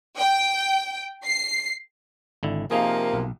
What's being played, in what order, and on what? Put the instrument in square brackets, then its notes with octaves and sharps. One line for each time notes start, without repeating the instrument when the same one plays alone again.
[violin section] G5
C7
[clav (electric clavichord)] G#1 D3 E4
[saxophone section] C3 F3 A#3 [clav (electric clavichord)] D#4 G#4
[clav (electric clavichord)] B1